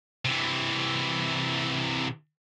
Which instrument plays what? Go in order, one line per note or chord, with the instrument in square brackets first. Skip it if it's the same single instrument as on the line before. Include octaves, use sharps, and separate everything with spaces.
[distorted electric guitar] C3 E3